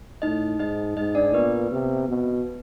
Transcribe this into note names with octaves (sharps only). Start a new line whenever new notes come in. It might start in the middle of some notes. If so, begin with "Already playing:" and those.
A2 D#4 D#5
G#2 D#4 D#5
G#2 D#4 D#5
D4 D5
A#2 B3 B4
C3
B2